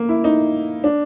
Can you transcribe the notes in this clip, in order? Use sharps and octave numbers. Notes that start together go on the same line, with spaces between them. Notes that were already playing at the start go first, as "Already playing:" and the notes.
Already playing: A#3
E4
D#4
D4